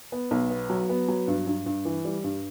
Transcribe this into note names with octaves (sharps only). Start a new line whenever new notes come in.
B3
B1
B3
F#3
B3
F#3
G2
G2
G2
E3
G3
G2